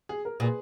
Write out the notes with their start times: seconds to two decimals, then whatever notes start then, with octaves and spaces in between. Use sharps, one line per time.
0.09 G#4
0.25 A#4
0.40 A#2 G#4 B4